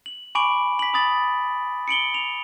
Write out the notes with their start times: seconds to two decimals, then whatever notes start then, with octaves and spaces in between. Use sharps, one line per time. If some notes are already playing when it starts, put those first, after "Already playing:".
0.06 F#7
0.35 G#5 B5 C#6 D6 D7 F#7
0.79 B6 F#7
0.93 B5 D#6 A6 F#7
1.88 C#7 D7 F#7 G7
2.14 F7